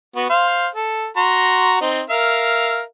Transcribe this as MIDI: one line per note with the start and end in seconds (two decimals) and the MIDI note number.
0.16 0.29 59
0.16 0.29 66
0.30 0.67 72
0.30 0.67 77
0.75 1.07 69
1.17 1.79 66
1.17 1.79 82
1.17 1.79 84
1.81 2.01 60
1.81 2.01 63
2.10 2.82 70
2.10 2.82 76
2.10 2.82 77